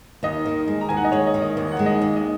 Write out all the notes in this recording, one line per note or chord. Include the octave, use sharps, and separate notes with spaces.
D#2 D#5
D#3
G#3
A#5
D#2 G#5
F#5
D#5
G#3 C#5
D#5
D#3
D#5
D#2 D#5
F#5
G#3
D#5
D#2
D#5